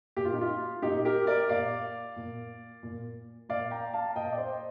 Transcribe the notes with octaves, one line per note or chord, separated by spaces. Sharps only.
A#2 G4
F4
D#4
F4
A#2 D#4 G4
G4 A#4
A#4 D5
A#2 D5 F5
A#2
A#2
A#2 D5 F5
G5 A#5
F5 A5
A#2 D#5 G5
D5
C5 D#5